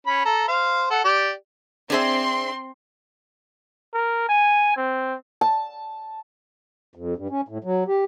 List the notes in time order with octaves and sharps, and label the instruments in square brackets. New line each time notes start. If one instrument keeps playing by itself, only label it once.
[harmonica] C#4 B5
A4 A#5
C5 F5
A4 F#5
G4 D5
[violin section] C4 C6 [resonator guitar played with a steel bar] D4 G#4 E5
[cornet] A#4
G#5
C4
[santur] A5
[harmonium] F2
G2
C#4
A2
F#3
G4